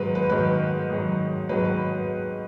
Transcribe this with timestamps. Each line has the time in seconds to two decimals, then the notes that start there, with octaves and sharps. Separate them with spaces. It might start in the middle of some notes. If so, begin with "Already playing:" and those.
Already playing: G#2 D#3 F#3 B4
0.15 B4
0.30 G#2 D#3 F#3 B4
0.90 G#2 D#3 F#3
1.49 G#2 D#3 F#3 B4
1.65 B4